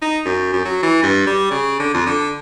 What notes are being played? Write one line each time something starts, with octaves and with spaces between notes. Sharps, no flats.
D#4
F#2
F#2
F#3
E3
G2
G3
C#3
D3
F2
D3